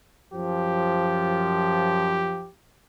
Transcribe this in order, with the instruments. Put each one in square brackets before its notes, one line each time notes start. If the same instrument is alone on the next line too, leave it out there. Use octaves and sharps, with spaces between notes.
[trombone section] F#2 F3 [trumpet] G4